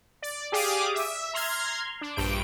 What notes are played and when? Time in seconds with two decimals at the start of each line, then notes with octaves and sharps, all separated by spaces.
0.22 D5
0.52 G4 G#4 D5 F5 D6 D#6
0.95 E5
1.34 A#5 C6 F6 G#6
2.01 D4
2.16 A#1 G2 G5 D7